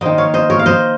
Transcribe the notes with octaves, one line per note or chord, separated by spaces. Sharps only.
D#3 A#3 C5 D#5
C#5 F5
C5 D#5
A#4 C#5
F5
C5 D#5